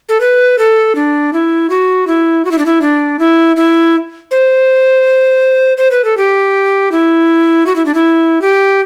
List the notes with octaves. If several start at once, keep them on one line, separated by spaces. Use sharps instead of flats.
A4
B4
A4
D4
E4
F#4
E4
F#4
E4
D4
E4
D4
E4
E4
C5
C5
B4
A4
G4
E4
F#4
E4
D4
E4
G4